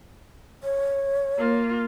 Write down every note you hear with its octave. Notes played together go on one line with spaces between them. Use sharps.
C#5
A#3 F4